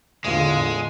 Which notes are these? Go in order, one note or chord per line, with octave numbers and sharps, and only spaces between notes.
E2 A2 D3 G#3 F4